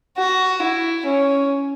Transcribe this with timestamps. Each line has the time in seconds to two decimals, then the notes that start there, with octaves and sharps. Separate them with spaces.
0.17 F#4
0.62 E4
1.06 C#4